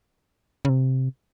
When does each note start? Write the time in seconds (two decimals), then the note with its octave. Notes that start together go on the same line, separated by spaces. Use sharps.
0.65 C#3
0.69 C3